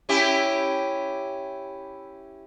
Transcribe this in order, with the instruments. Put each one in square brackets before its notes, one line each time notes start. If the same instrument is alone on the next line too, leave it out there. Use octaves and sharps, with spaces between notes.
[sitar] C#4 E4 G4